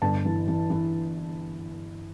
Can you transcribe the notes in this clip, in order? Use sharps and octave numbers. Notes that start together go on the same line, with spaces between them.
G1 A5
E3
E3
E3